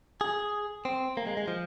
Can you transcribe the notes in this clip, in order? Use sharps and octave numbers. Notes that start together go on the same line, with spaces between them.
G#4
C4
A#3
G#3
G#3
F3